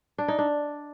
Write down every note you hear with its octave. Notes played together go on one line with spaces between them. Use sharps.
D4
D#4
D4